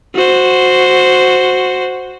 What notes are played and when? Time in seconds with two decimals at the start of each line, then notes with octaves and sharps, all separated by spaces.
0.15 F#4 C5